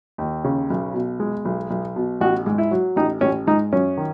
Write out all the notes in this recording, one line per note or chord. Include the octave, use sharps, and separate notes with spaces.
D#2
C#3
B1
B2
G#3
B1
B1
B2
A1 F#4
G#2
E4
F#3
A1 D#4
A1 C#4
G#2 D#4
F#2 C#4
D#3